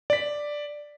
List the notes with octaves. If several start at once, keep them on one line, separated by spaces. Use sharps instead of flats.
D5 B6